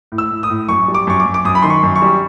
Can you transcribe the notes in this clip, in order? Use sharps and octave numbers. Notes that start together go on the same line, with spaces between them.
A2
E6
A2
D#6
A2
F#2 C#6
G3
D6
F#2 C#6
D6
F#2
D6
F#2 D#6
B5
D#3 C6
C#6
F#2
C#6
G3